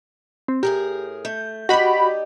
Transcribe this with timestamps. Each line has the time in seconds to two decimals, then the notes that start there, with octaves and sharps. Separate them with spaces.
0.48 C4
0.63 A2 G4 G#4 A#4
1.25 A3 G6
1.69 D#4 F#4 G4 D5 B5